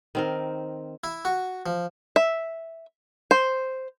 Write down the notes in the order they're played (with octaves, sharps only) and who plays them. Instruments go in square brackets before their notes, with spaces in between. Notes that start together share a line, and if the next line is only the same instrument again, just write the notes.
[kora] D#3 C4 A#4
[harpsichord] E4
F#4
F3
[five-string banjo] E5
C5